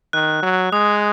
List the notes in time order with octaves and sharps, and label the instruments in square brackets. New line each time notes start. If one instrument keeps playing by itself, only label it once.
[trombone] D#3 [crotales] F#6
[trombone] F#3
[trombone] G#3 [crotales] D#6